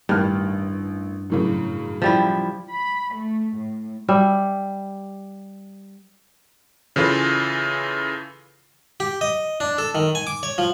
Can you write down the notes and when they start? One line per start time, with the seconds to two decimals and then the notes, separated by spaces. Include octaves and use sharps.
0.09 A1 G2 D#3 F6
1.30 F#2 A2 C#3
2.02 F3 G3 E4
2.70 B5
3.14 A3
3.56 A2
4.09 G3 E5
6.96 C#3 E3 F4 A4 B4
9.00 G4
9.21 D#5
9.60 D4
9.78 A4
9.95 D#3
10.15 G#5
10.27 D6
10.43 C#5
10.58 F3